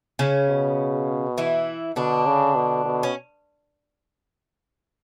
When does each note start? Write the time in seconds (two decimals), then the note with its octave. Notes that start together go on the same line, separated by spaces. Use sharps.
0.19 C#3 C#4
0.48 B2
1.38 E3 E4
1.96 B2 D3 D4
2.26 C#3
2.56 B2
2.85 B2
3.03 C#4